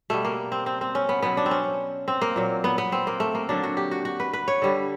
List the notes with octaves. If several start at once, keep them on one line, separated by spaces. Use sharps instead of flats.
B2 G3 A3
A#3
C4
C4
C4
C#4
B3
B2 F#3 B3
D4
C4
C#4
C4
A#3
A#2 F#3
B3
B3
C4
A#3
A3
A#3
D3 F#3 D4
F#4
G4
F#4
F#4
B4
B4
C#5
D3 G3